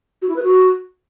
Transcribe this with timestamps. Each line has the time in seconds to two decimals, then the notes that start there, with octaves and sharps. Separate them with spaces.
0.22 F#4
0.29 E4
0.36 B4
0.43 F#4